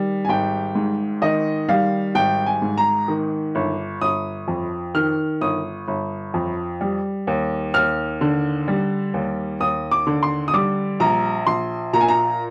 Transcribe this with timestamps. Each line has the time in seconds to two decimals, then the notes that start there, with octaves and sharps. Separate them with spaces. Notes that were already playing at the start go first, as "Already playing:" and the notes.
Already playing: D#3 G3
0.25 G#5
0.29 G#1 G5
0.75 G#2
1.22 D#3 D#5
1.69 G3 F5
2.15 G#1 G5
2.46 G#5
2.62 G#2
2.78 A#5
3.08 D#3
3.55 G1
4.01 G1 D#6
4.48 F2
4.95 D#3 F6
5.41 G1 D#6
5.88 G1
6.34 F2
6.81 G3
7.27 D#2
7.74 D#2 F6
8.21 D3
8.68 G3
9.14 D#2
9.60 D#2 D#6
9.91 D6
10.07 D3
10.23 C6
10.48 D#6
10.54 G3 D6
11.00 A#1 A#5
11.46 A#1 C6
11.93 A#2 A#5
12.01 G#5
12.08 A#5